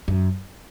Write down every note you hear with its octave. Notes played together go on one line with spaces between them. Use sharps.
F#2